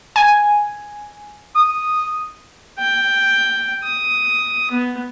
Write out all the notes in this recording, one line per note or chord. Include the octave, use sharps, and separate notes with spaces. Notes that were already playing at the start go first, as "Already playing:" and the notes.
G#5
D#6
G5
D#6
B3